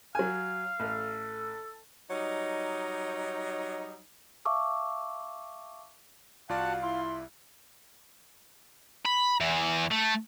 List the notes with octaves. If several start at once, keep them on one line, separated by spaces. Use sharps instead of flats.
F#3 F5 G#5
A1 A4
F#3 G3 D#4
E5 F5 A5 C#6 D6 E6
C2 F4 F#4 D5 F5 F#5 A5
E4 C6
B5
E2 E3
A3